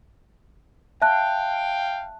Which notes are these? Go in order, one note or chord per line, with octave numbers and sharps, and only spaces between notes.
E5 F5 G5 A5 F#6